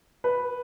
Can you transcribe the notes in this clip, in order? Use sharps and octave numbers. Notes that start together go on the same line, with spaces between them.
B4